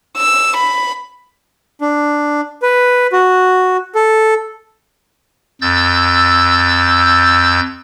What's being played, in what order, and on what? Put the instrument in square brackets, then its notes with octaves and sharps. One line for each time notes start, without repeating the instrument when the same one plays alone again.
[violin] E6
B5
[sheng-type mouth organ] D4
B4
F#4
A4
[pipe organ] F2 E6 G6 A6